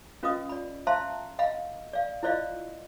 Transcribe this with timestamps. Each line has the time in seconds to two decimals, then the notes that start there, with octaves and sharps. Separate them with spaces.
0.23 C#4 F4 B4 D#5 F5 D#6
0.49 D5 B5
0.87 C5 E5 F5 A5 A#5 C6
1.39 D#5 F5 F#5 B5
1.93 D5 F5
2.23 E4 F4 C5 D5 D#5 F5